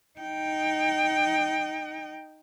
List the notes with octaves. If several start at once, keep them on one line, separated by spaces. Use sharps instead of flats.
D#4 G5